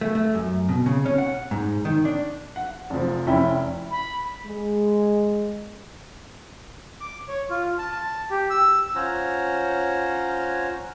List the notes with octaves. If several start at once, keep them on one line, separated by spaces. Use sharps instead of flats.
A3
A3
F#2
B2
C#3
C#4
F#5
G#2
D#3
D4
F#5
F1 F3
F1 C#4 E4 E5 G5 B5
B5
G#3
D6
C#5
F4
A5
A5
G4
E6
C#4 F4 C5 C#5 F#5 A#5